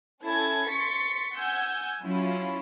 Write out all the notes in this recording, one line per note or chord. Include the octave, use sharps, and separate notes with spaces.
C#4 E4 A4 G#6
C6 C#6 A6 B6 C#7
F#5 G#5 E6 G6 G#6
F#3 C#4 E4 F4